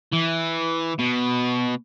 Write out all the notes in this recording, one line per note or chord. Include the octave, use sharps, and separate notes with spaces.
E3
B2